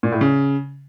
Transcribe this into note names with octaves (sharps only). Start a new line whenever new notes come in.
A#2
A2
C#3